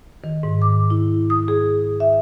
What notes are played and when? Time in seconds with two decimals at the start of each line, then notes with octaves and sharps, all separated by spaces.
0.24 D#3
0.43 G#2
0.62 D6
0.90 E4
1.30 D#6
1.48 G#4
2.00 E5